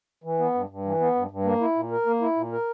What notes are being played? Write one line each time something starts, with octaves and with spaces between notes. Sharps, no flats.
E3
B3
G2
G2
E3
B3
G2
G2
A#3
E4
A#2
A#4
A#3
E4
A#2
A#4